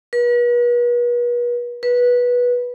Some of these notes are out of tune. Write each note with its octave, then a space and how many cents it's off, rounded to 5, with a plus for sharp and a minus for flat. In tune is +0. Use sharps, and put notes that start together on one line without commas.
B4 -40
B4 -15